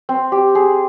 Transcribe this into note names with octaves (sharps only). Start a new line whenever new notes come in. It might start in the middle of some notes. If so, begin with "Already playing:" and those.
C4
G4
G#4